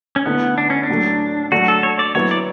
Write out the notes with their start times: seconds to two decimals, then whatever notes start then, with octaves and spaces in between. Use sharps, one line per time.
0.16 C#4
0.26 D3 A3 B3 E4
0.58 D4
0.70 C#4
0.83 D4
0.89 A2 F#3 A3
1.52 F#3 A3 D4 F#4
1.68 A4
1.83 C#5
1.99 D5
2.15 F#3 B3 E4 C#5
2.31 D5